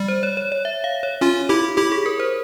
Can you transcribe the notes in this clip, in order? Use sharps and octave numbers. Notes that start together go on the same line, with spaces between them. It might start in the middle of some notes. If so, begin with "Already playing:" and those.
Already playing: G3
C5
C#5
C#5
C#5
E5
F5
C#5
C#4 F4
E4 G4
E4 G4
G#4
A#4
C5